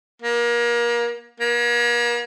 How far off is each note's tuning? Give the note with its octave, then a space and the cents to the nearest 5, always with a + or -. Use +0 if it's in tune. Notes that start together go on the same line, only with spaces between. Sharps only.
A#3 +30
A#3 +40